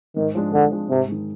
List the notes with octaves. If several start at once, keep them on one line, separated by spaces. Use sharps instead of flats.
G#2 D#3
F3 G#3 D4
G#2 D3
F3 G#3 D4
G#2 C3
D#3 G#3